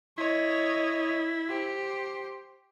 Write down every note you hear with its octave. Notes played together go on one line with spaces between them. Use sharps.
E4 C#5 D#5
G4 C5